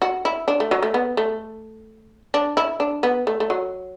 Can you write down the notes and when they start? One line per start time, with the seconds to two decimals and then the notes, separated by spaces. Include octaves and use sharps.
0.02 F#4
0.25 E4
0.48 D4
0.60 A3
0.71 F#3
0.83 A3
0.94 B3
1.17 A3
2.34 D4
2.57 E4
2.80 D4
3.03 B3
3.27 A3
3.40 A3
3.50 F#3